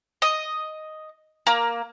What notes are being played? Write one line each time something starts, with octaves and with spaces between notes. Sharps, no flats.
D#5
A#3